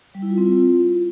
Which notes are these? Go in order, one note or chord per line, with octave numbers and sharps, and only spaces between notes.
G3
E4
F4
C4
F4